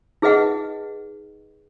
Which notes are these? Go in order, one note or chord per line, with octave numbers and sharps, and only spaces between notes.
D#4 G#4 B4 D#5 F#5